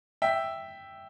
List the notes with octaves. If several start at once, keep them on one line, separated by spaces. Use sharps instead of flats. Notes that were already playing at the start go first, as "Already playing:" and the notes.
E5 G5